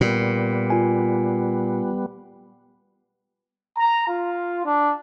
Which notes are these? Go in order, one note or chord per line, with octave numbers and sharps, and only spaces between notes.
A#2 G3 B3
F4 G#5
A#5
F4
D4